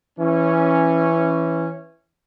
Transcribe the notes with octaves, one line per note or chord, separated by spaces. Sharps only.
E3 C#4